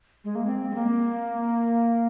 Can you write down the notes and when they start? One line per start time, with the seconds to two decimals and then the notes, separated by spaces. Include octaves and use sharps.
0.24 G#3
0.35 A#3
0.46 C4
0.70 G#3
0.75 A#3